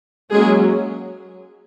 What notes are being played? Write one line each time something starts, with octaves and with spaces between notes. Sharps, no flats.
F#3 G#3 A#3 C#4 G#4